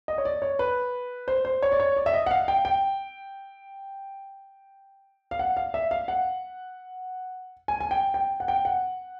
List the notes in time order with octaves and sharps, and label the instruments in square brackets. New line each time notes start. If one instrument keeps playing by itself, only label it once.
[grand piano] D#5
C#5
D5
C#5
B4
C5
C5
C#5
D5
C#5
D5
E5
D#5
F#5
F5
G5
G5
F5
F#5
F5
E5
F5
F#5
G#5
G#5
G5
G5
F#5
G5
F#5